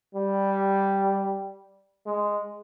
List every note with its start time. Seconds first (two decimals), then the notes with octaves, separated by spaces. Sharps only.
0.15 G3
2.06 G#3